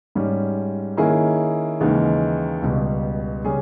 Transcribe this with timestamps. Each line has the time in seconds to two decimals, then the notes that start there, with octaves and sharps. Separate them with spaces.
0.15 G#2 G3 C#4
0.97 D#3 A#3 C#4 E4 G#4
1.80 D#2 C#3 E3 G#3 D#4
2.62 C#2 B2 G3
3.45 C#3 G3 C#4 G#4